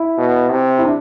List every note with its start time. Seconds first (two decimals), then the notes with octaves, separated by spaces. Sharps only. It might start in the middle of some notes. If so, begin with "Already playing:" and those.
Already playing: E4
0.18 B2
0.51 C3
0.79 E4
0.85 D4